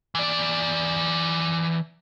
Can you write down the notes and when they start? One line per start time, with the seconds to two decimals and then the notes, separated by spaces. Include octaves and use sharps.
0.15 E3 D5